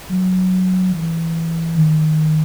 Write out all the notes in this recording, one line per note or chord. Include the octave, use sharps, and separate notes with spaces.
F#3
E3
D#3